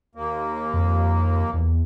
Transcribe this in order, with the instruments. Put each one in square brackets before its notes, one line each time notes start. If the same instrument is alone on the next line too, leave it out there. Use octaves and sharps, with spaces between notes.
[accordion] D#2 A#3
[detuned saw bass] F2
E2